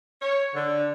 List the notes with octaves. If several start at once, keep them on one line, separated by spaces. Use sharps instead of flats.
C#5
D3